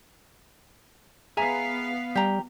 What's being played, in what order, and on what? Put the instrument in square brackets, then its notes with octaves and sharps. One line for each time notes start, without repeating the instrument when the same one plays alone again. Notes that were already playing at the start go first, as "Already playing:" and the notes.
[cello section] B3 F5 [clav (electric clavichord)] G#4 [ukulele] E5 G#5 A#5
[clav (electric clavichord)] G3 [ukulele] G4 A#5